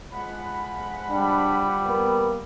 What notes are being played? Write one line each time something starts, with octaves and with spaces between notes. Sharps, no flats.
F3 G#3 F#5 B5
G3 D4
A#3 B3